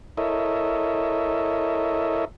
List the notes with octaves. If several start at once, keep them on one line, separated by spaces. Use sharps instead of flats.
E4 A4 A#4 C#5 D#5 E5